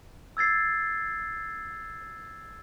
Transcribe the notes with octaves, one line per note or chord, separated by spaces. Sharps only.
E6 G#6 A6 C7